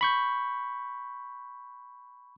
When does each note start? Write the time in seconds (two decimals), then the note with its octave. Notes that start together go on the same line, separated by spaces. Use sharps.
0.01 B5 C#6 G6